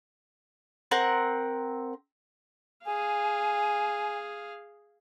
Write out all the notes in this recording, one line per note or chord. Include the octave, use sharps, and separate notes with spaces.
C4 A#4 F#5
G#4 F5 G#5